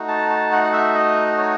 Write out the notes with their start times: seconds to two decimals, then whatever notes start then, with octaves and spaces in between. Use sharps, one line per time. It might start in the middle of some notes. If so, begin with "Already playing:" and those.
Already playing: A3 D#4 F#4
0.08 A5
0.30 A5
0.52 F#5
0.64 F#5
0.73 E5
0.95 D#5
1.38 C#5